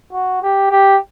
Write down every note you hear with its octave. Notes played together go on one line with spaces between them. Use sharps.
F#4
G4
G4